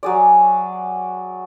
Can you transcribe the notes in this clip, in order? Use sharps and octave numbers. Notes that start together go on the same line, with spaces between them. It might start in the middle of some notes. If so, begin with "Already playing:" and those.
F#3 G#4 D5